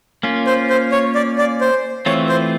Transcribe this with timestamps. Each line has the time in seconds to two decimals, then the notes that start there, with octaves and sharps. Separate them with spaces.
0.23 A#3 C#4 F4
0.47 C5
0.70 C5
0.92 C#5
1.15 D5
1.38 D5
1.61 C5
2.06 E3 A3 C4 F4 C#5
2.29 C5